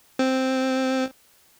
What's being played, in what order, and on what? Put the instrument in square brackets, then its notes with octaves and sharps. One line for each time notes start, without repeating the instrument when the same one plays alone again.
[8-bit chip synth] C4